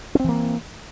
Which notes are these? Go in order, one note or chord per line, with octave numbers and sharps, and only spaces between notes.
E3 A#3 C4 C#4